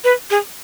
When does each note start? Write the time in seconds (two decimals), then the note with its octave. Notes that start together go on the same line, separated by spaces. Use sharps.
0.04 B4
0.31 G#4